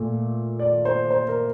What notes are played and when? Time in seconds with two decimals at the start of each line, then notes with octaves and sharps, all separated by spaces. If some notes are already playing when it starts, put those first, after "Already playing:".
Already playing: A#2 A3
0.59 D5
0.85 C5
1.11 C5
1.28 A#4